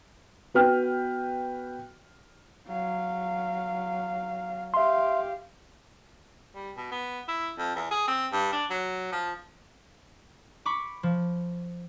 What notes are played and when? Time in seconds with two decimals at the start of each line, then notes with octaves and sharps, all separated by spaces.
0.54 B3 F#4 B4 G5 F6
2.67 F#3 F5
4.74 G4 E5 F5 C6
6.55 G3
6.77 B2
6.92 B3
7.28 E4
7.58 F2
7.75 E2
7.91 G#4
8.08 C4
8.32 G2
8.53 D4
8.70 F#3
9.12 F3
10.66 B5 C#6 D6
11.03 F3